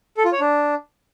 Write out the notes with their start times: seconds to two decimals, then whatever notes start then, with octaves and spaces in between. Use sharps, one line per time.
0.17 A4
0.25 F4
0.33 C#5
0.40 D4